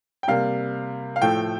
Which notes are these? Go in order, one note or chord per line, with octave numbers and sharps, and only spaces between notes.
G5
C3 G3 A#3 F5
F5
A2 F3 A3 G5